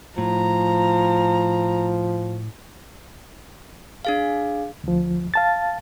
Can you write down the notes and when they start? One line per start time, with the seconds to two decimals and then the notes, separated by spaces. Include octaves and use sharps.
0.18 A2 F3 A#5
4.05 D4 G#4 F5
4.84 D2 F3
5.34 F5 A5 A6